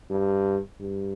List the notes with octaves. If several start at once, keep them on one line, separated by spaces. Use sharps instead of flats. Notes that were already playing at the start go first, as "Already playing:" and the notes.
G2
G2